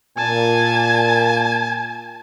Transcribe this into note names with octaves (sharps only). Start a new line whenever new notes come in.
A#2 G#5 A5